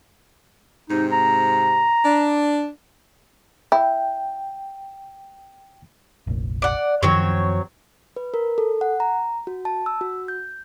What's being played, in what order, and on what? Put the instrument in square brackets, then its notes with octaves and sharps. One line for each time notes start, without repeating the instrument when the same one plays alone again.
[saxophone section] G#2 C3 C4 [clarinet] D#4
[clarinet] A#5
[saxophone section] D4
[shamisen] E4 [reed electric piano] G5
[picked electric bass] F1 A#1
[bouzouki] D5 F#5
[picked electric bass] F#2 D#3 F3 [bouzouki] F#3 C4 C#5
[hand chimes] B4
A#4
A4
F#5
A#5
F#4
A5
E6
F#4
G6